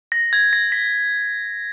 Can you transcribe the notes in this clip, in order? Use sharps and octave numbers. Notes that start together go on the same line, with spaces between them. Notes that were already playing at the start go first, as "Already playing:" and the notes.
A#6
G#6
A#6
B6